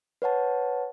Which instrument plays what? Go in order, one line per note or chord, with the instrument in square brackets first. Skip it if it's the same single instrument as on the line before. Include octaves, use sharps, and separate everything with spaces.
[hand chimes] B4 C#5 F#5 A5